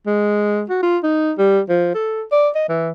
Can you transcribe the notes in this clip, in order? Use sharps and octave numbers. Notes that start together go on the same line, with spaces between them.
G#3
F#4
F4
D#4
G3
F3
A4
D5
D#5
E3